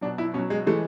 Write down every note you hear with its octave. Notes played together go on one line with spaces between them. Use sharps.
B2 F#3 D4
E4
B2 F#3 C#4
G#3
E3 G#3 A3